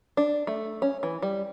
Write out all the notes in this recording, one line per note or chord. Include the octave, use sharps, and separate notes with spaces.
D4
A3
C#4
E3
G3